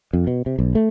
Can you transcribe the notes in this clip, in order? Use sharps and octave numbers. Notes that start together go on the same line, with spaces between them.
F2
B2
C3
B1
A3